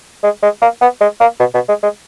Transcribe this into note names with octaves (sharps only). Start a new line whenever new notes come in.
G#3
G#3
A#3
B3
G#3
A#3
B2
B2
G#3
G#3